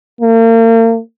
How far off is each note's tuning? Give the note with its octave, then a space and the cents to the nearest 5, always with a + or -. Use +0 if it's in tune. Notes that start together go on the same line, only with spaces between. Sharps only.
A#3 -40